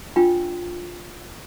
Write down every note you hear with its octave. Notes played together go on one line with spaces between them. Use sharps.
D4 F4 G5